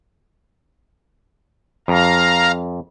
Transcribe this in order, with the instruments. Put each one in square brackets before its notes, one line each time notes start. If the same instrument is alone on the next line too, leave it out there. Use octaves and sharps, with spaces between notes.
[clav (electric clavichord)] F2 [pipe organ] F5 A#5